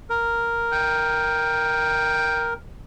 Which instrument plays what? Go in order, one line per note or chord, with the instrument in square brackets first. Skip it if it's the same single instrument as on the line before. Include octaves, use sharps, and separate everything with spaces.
[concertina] A#4
[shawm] G5